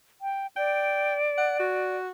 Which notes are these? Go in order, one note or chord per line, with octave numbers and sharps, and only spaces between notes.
G5
D5 G5
F#5
F#4